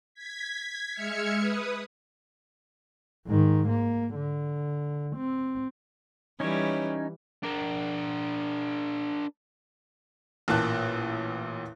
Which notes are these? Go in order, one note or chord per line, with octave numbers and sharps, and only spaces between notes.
G#6 B6
G#3 E5 F6 G#6 C#7
B4 D#6
G#2 D#3
A#3
D3
C4
E3 G3 C#4 D#4 C#5
D4 A#4
A1 A#2 A5 F#6